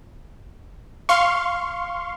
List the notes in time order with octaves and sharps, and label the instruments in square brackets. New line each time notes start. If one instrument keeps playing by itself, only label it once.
[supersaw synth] F5 C6 C#6